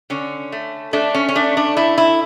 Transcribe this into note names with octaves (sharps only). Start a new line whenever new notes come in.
D3 C#4
A3
A3 D4
C#4
C#4
A3 D4
D4
A3 E4
E4